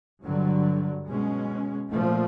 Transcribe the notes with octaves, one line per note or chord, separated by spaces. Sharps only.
G2 D3 F#3
B2 G#3 C#4
A#2 F3 A3